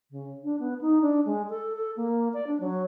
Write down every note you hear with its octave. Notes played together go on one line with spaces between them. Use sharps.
C#3
D4
B3
D#4
D4
G#3
A4
A4
A#3
D5
D4
F#3